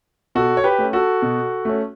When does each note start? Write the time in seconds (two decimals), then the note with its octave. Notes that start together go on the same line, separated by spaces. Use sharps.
0.35 B2 F#4 A4
0.57 C#5
0.64 G4 B4
0.78 A3 C#4
0.93 F#4 A4
1.22 B2
1.65 A3 C#4